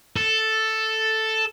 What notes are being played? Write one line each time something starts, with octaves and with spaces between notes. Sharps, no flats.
A4